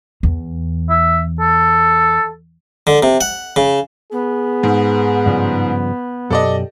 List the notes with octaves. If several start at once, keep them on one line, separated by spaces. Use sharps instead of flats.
E2
E5
A4
D3
C3
F#5
C#3
B3 G#4
G#2
G2 C#3 F3
F#2 B2 G4 A4 D5 D#5